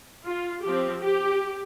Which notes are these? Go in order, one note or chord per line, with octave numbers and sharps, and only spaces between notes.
F4
F3 C4 G4
G4